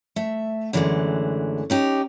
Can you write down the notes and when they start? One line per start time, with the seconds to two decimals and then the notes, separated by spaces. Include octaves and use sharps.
0.16 A3 E5
0.73 F#2 D3 E3 F3 G#3 A3
1.70 C#4 D#4 G4